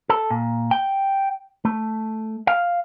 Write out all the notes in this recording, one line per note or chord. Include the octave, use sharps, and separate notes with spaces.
A4
A#2
G5
A3
F5